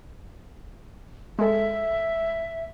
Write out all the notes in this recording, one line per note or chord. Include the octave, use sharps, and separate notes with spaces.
G#3 A4 E5